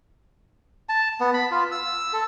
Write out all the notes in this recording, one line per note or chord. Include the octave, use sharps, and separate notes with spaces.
A5
B3
B5
F4
E6
A4